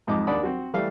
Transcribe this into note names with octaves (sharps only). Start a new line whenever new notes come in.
F2 G#2 F3 D#5 D6
D#2 D4 D5 F#5 B5 D#6
C4 F#4
E3 G3 A3 F5